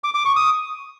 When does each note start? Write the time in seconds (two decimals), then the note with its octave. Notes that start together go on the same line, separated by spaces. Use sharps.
0.04 D6
0.14 D6
0.25 C#6
0.36 D#6